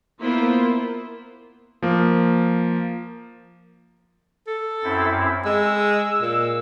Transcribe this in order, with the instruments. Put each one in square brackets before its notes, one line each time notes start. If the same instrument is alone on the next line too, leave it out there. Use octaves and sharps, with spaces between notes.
[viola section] A#3 B3 E4 F4 C5
[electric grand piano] F3 A#3
[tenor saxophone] A4
[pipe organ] F#2 C4 E4
[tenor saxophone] G#3 [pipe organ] E6
[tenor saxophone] A#2